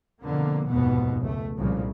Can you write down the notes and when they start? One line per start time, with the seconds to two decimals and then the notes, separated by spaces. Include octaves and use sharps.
0.24 F2 B2 D3 A#3
0.70 F1 D#2 G#2 B2 B3
1.22 C#2 A3
1.57 C2 A#2 C#3 F3